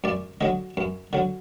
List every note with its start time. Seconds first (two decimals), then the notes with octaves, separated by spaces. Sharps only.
0.04 F#2 D5
0.41 D3 F#3 D#5
0.77 F#2
1.13 D3 F#3